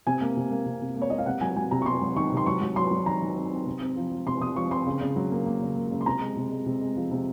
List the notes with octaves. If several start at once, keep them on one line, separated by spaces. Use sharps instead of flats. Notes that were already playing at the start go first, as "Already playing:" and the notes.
C3 G#5
A#3
C3
A#3
C3
C3
A#3
C#5
A#3 D#5
F5
C3 F#5
F#3 G#5
F#3 G#5
C3 A#5
C#6
C3 C6
F#3
D#3 C#6
C3
C6
F#3 C#6
F#3
F#3 C6
F#3
D#3 A#5
D#3
C4
C4
C3
C4
F3
F3
C3 C6
C3 D#6
F3 C#6
C4 C6
C#3
C#3
F#3
A#3
A#3
C#3
A#3
C#3
C6
C3 A#5
G#3
C3
G#3
C3
G#3
F3
C3